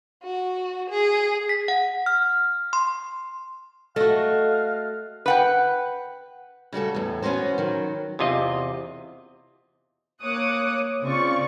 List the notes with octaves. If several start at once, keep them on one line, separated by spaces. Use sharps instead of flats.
F#4
G#4
B6
F#5
F6
C6
A3 F#4 A4 D#5 F5
B4 F#5 G5
C#3 G3 F#4 A4
E2 A2
B3 C#4 D4 F#4 C5
D#3 F#3
E2 C3 F4 D#5
A#3 C#5 D6 D#6 F#6 C#7
C#3 C4 F4 D5 C#6